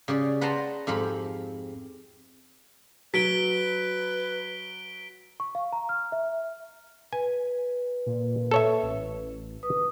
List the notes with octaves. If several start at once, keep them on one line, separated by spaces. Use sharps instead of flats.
C#3 G4 D5
B4 F#5 G5 A5 A#5 C6
F2 G#2 G4 F5 B5
F#3 B4 B6 D7 G7
C#6
F5
A#5
F6
E5
B4 G#5
A#2
A4 C#5 E5
A1
B4 D#6